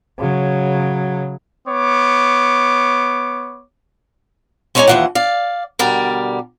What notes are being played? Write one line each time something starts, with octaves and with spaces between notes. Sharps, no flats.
C#3 F#3
B3 C#5 D6
G#3 C#4 D#4 C#5 D5 G#5
D#2 C3 E3 F3 F#5
D5 F5
B2 D3 G3 A#4 D5